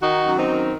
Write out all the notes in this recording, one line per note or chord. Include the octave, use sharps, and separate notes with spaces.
D#3 D#4 F#4
F#2
C4 D#4
D#3